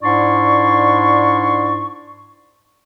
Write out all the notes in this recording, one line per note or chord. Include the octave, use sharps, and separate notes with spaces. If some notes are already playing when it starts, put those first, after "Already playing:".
G#2 D4 E4 D5 C6 C#6